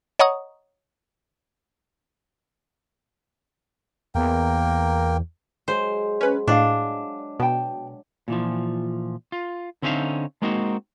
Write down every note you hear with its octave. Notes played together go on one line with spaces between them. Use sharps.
C#5 D#5 F#5 A#5 C#6 D#6
E2 A#3 A#4 G5
F#3 G#3 C5
C#4 B4
A2 D4 D5 D#5 F5
B2 G5 A5
A#2 E3 F3
F4
D3 C4 C#4 D#4 E5 F5
G#3 A#3 C4 D#4 F#4